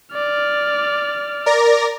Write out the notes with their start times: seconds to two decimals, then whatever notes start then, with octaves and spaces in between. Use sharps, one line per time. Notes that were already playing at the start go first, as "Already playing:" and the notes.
0.14 D5 F6
1.46 A#4 D5 A#6